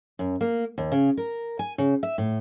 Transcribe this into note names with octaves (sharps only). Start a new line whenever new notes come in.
F#2
A#3
D#2
C#3
A#4
G#5
C#3
E5
A2